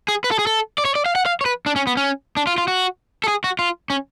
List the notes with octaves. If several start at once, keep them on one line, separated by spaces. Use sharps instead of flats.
G#4
B4
A4
G#4
A4
D5
C#5
D5
F5
F#5
F5
C#5
B4
D4
C#4
B3
C#4
D4
F4
F4
F#4
A4
G#4
F#4
F4
C#4